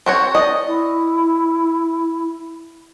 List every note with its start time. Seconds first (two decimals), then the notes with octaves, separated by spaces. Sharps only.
0.06 C4 F#4 C#5
0.35 D5 D#5
0.67 E4